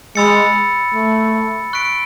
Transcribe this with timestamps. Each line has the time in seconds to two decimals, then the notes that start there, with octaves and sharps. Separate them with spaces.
0.15 G#3 B5 E6 A6 C#7
0.94 A3
1.73 C#6 F#6 B6 D7